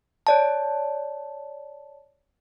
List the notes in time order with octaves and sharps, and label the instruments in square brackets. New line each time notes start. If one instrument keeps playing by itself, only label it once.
[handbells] C#5 D5 A5